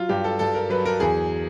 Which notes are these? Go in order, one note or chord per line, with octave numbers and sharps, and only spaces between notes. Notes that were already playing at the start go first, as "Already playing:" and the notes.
Already playing: F#3 F4
G2 G4
A4
G2 A4
A#4
F#3 B4
A#4
E2 G#4